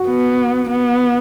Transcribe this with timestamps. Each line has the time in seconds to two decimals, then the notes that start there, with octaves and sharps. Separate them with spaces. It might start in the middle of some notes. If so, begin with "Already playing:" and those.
Already playing: F#4
0.08 B3
0.70 B3